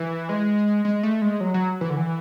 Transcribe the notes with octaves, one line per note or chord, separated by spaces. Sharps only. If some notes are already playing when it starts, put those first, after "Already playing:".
Already playing: E3
G#3
G#3
A3
G#3
F#3
F#3
E3
D3
E3